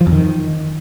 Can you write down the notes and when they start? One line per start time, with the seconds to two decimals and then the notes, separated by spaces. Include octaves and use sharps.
0.01 F3
0.07 F2
0.13 D#3